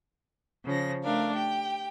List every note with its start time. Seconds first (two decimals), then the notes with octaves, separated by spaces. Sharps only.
0.66 C#3 F3 A#6
1.03 A3 D4 A#4 F5
1.34 G4 G5